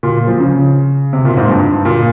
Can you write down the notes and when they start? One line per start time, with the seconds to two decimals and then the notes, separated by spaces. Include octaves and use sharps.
0.03 A#2
0.27 F3
0.40 C#3
1.13 C3
1.25 A#2
1.37 G#2
1.49 G2
1.85 A#2